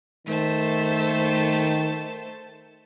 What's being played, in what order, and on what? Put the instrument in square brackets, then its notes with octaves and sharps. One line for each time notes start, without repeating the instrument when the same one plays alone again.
[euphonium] D#3 [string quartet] A3 C5 A5